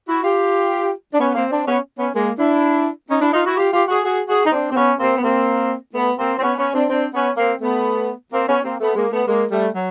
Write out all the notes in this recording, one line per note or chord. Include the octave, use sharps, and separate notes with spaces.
E4 F#4
F4 G4
D4
B3 C#4
A#3 C4
C4 D4
B3 C#4
B3 C#4
G#3 A#3
D4 E4
C#4 D#4
D4 E4
D#4 F4
E4 F#4
F4 G4
F4 G4
F#4 G#4
F#4 G#4
F#4 G#4
D#4
C4 D4
C4
B3 C#4
A#3 C4
B3
A#3 C4
A3 B3
A#3 C4
C4
B3 C#4
B3 C#4
C4 D4
C4 D4
B3 C#4
A#3 C4
A3 B3
A#3 C4
B3 C#4
A#3 C4
A3 B3
G#3 A#3
A3 B3
G#3 A#3
G3 A3
F#3